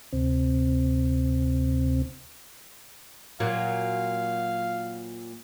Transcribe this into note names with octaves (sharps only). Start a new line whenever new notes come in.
D2 C3 C4
A#2 F#3 F5